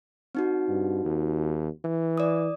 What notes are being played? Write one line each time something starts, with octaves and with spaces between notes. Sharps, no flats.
C4 D#4 F#4
G2
D#2
E3
D5 D#6